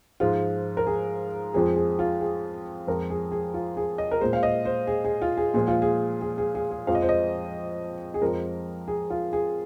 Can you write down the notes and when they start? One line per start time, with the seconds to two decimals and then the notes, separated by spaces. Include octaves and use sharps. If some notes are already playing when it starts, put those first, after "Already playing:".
0.20 G#2 F3 G#3 F4
0.77 A#4
0.87 G#4
1.54 F2 F3 G#3 G#4
1.76 G#4
1.99 F4
2.21 G#4
2.87 F2 F3 G#3 A#4
3.10 G#4
3.32 G#4
3.54 F4
3.77 G#4
3.98 D#5
4.11 A#4
4.21 A#2 G#3 C5
4.33 F5
4.43 D#5
4.65 C5
4.87 G#4
5.04 G#4
5.22 F4
5.37 G#4
5.54 A#2 F3 G#3 G#4
5.68 F4
5.82 G#4
6.21 G#4
6.38 G#4
6.55 G#4
6.71 G#4
6.87 F2 F3 G#3 F5
6.95 D#5
7.02 C5
7.09 D#5
8.14 G#4
8.22 F2 F3 G#3 A#4
8.88 G#4
9.10 F4
9.33 G#4